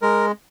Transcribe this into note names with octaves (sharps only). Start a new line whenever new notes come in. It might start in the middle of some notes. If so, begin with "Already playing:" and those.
G#3 A#4